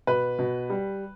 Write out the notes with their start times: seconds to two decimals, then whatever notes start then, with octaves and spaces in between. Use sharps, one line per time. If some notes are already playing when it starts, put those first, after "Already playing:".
0.07 B2 B4
0.39 B2
0.70 G3